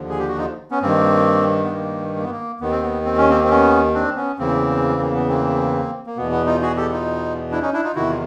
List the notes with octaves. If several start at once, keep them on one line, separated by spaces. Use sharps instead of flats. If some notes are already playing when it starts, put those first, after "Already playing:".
Already playing: D#2 D3 F3
G#4
G4
F#4
D#4 F4
B3 C#4
G2 D#3 A#3 C4
B3
A#3
A#3
B3
A#3
D#2 D#3 B3
C4
B3
C4
C#4
A#3 C4
C4
B3 C#4
C4 D4
B3 C#4
E2 C#3 E3 A#3 C4
A#3
B3
A#3 C4
A#3
E2 B2 B3
B3
D#4 F4
F#4 G#4
G4 A4
D#4 F4
D4 E4
C#4 D#4
D4 E4
D#4 F4
E2 C3 D#3 E4 F#4
F4